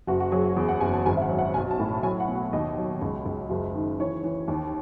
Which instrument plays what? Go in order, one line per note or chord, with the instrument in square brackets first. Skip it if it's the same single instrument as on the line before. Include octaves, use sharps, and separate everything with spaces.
[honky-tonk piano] F#1 F#4
F#4
F#3 G#4
F#4
E2 G#4
F#5
F#1 G#5
A5
G#1 G#5
E5
F#5
F#3
F#5
B1 G#5
A5
A2
F#3 G#5
F#5
B2
F#5
D#2 D#5
F#3
C#2
C#2
F#1
D#3
E3 C#5
E3
D#2